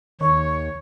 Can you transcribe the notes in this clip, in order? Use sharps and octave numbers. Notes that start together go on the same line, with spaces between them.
D#2 D#3 C#5 C#6